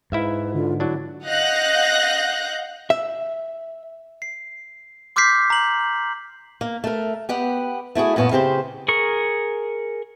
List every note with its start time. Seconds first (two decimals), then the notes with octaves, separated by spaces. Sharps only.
0.12 G#2 E4 B4 E5 F5
0.54 D3 F4
0.80 F#3 D4 E4
1.25 D#5 F5 F#5 F#6 G6 A#6
2.90 E5
4.22 C7
5.16 C6 D6 F6 G6 B6 C7
5.50 A#5 F#7
6.61 A#3
6.84 A3 A#4
7.29 B3 G4 F#5
7.95 A3 E4 F#4 G#4
8.16 F#2 A#2 B3 C#5 A5
8.31 C#3 C4 G4 C5
8.88 G#4 A#4 C#6